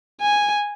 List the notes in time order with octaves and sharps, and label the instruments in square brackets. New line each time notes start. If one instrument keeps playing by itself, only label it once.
[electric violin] G#5